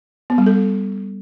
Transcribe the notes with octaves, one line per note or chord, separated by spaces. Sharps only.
B3
G3
A4